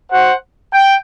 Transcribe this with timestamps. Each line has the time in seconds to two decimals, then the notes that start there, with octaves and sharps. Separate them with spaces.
0.10 F#4 C5 F#5
0.72 G5